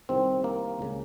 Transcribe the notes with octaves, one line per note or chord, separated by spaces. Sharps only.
C2 C3 D#3 C4
A#3
C#2 C#3